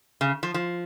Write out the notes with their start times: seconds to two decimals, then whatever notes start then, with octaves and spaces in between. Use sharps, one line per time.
0.21 C#3
0.43 F3
0.54 F3